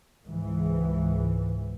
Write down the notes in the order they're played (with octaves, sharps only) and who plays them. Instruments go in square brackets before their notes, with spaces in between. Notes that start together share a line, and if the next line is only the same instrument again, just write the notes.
[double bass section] C#2 G#2 E3